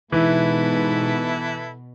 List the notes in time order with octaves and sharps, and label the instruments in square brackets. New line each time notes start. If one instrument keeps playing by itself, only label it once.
[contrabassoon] G#2 [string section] B2 [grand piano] E3 [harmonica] E4 A4 B4